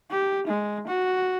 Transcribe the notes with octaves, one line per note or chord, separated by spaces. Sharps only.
G4
G#3
F#4